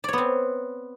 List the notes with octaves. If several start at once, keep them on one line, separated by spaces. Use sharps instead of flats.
B3 C4 C#5 D5